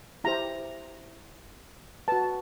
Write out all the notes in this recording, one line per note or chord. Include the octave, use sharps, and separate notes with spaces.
E4 G4 C5 A#5
F#4 B4 A5